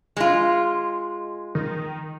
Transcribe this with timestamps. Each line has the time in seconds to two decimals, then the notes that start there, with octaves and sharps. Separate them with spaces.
0.17 G#3 F4
1.55 D#3